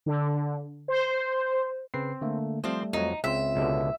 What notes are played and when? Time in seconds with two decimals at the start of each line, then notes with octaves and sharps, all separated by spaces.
0.06 D3
0.88 C5
1.94 C#3 C4 B4 C7
2.21 D3 A3 A#3
2.64 F3 G3 A3 C4 C5
2.93 F2 F#3 D#4
3.24 C#2 C4 F4 E5 C6
3.55 C#2 B2 D3